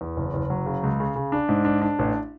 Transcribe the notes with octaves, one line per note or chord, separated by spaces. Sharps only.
E2
F#1
F#1
F#3
C#3
C#2
C#3
C#3
D4
G#2
D4
D4
A1